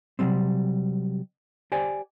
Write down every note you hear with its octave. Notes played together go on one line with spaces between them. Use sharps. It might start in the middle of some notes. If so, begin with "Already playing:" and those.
C3 D#3 F#3 G3 C4
G4 C5 D5 G#5